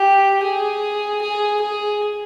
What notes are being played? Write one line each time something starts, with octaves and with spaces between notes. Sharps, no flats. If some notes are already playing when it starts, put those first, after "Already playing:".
Already playing: G4
G#4
G#4
G#4